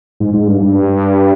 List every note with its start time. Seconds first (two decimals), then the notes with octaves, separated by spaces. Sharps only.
0.20 G#2
0.34 G#2
0.48 G2
0.60 G2